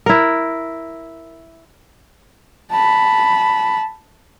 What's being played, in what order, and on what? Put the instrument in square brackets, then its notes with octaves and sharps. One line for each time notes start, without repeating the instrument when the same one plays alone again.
[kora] E4 A#4
[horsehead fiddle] A5 B5